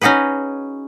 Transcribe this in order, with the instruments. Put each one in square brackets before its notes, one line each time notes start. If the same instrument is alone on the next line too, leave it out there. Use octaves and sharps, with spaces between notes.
[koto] C#4 D#4 F#4 G#4 B4